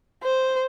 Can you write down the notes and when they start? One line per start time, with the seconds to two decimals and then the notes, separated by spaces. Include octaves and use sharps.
0.24 C5